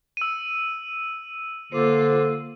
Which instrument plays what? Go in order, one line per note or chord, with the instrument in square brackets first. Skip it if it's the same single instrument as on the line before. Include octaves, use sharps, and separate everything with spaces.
[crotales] E6 D#7
[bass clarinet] D3 [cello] A#3 F4 [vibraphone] C5 D6